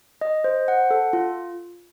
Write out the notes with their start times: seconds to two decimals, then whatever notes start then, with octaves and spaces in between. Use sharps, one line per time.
0.21 D#5
0.44 C5
0.68 F#5
0.91 A4
1.13 F4